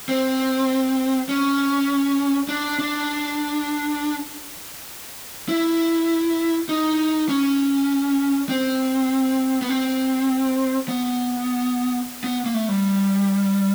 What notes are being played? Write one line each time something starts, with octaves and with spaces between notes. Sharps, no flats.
C4
C#4
D4
D4
E4
D#4
C#4
C4
B3
C4
B3
B3
A#3
A3
G3